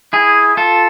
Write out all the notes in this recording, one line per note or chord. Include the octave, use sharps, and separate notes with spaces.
E4 G#4
F4 A4